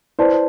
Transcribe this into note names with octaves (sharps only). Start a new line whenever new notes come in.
E4 B4 C5 D5 A5